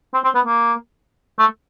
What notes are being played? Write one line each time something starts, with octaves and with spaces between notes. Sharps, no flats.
C4
C4
B3
A#3
A3